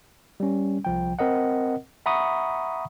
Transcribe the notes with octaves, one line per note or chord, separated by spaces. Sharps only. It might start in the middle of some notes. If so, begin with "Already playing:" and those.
G3 C#4
C2 F3 G5
C4 A#4 D#5 F#5
E5 F#5 A#5 B5 C#6 D#6